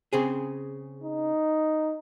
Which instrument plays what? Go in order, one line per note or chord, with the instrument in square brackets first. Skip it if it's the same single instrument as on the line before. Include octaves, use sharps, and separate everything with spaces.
[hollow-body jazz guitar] C#3 C4 G#4
[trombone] D#4